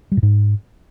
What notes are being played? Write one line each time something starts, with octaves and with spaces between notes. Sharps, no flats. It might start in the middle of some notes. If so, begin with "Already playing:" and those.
G3
A2
G#2